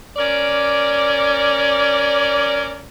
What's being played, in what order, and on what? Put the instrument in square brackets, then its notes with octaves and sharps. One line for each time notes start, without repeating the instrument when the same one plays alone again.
[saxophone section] C#4 A#4 D5